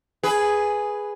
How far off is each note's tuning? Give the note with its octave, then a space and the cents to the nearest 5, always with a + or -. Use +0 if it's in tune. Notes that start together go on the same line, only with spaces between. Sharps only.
G#4 +0 B4 +0